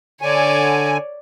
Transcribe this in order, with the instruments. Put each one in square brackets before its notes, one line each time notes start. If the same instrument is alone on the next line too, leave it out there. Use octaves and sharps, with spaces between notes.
[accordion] D3 G#5 [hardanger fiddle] C#5 D5